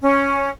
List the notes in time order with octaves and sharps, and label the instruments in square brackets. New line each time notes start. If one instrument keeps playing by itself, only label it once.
[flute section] C#4